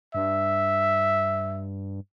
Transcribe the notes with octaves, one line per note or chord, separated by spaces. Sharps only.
G2 E5